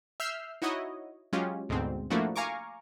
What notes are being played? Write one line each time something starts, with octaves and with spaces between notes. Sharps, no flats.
E5 E6 F6 G6 C7
D#4 E4 F#4 C#5 D#5
F#3 G#3 C#4 F4 G4
D2 G#2 B2 D3 C4
F3 A3 A#3 D4 E4 F#4
F5 G#5 A#5 C#6 D6